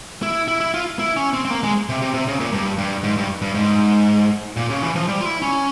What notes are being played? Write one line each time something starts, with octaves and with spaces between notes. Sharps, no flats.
E4
E4
E4
F4
E4
C#4
C4
C4
A#3
G#3
C3
C3
C3
C#3
A#2
G2
G2
G#2
G2
G2
G#2
A#2
C#3
E3
F3
G3
F4
E4
C#4